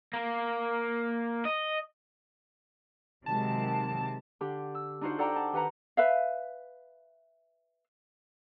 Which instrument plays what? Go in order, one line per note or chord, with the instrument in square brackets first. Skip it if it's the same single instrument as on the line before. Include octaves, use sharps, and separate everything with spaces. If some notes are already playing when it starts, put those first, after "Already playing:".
[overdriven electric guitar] A#3
D#5
[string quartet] C3 [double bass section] D#3 F#3 G#3 [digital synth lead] A5
[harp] D3 D4 G4
E6
D4 D#4 F4 F#4 C5
A4 D5 F#5 G5 A#5 D6
A5
D#3 G4 B4 F#5 A#5
[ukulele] B4 E5 F5